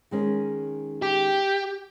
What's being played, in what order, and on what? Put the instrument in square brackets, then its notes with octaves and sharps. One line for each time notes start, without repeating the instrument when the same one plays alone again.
[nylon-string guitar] D#3 G#3 C#4
[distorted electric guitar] G4